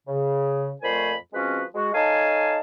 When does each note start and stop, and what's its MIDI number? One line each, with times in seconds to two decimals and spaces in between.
0.08 0.72 49
0.82 1.15 41
0.82 1.15 46
0.82 1.15 57
0.82 1.15 72
0.82 1.15 80
0.82 1.15 83
1.33 1.63 53
1.33 1.63 56
1.33 1.63 60
1.33 1.63 61
1.33 1.63 66
1.33 1.63 71
1.74 1.90 56
1.74 1.90 66
1.94 2.60 63
1.94 2.60 69
1.94 2.60 73
1.94 2.60 77
1.94 2.60 80
1.94 2.60 81